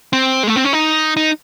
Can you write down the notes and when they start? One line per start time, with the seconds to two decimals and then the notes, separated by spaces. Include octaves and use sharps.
0.13 C4
0.43 G#3
0.47 A3
0.56 C4
0.65 C#4
0.73 D#4
1.17 D#4